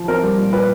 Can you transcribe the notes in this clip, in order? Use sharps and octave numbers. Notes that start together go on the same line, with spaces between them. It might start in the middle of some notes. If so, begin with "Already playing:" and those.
Already playing: F3
C4 A#4
G3
A#2
A#2 B4